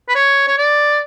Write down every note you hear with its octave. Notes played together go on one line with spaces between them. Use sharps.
B4
C#5
C#5
D5